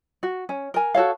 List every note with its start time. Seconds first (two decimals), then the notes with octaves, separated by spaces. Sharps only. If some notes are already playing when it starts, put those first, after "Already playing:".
0.23 F#4
0.49 C#4
0.74 A#4 G#5
0.94 F#4 A4 C#5 F5